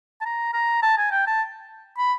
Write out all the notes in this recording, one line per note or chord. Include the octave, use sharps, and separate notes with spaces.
A5
A#5
A#5
A5
G#5
G5
A5
B5